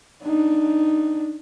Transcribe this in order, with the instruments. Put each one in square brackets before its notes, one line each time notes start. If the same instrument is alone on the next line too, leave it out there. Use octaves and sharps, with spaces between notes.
[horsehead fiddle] D4 D#4